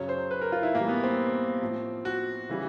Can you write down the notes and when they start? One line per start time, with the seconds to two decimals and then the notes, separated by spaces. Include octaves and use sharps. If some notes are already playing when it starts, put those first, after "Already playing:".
Already playing: F#2 C#3 F#3 C#5
0.09 C5
0.31 B4
0.41 A#4
0.52 F4
0.63 E4
0.74 A2 E3 G3 A#3
0.89 B3
1.04 C4
1.61 A2 F3
2.05 F#4
2.50 C#3 E3 G3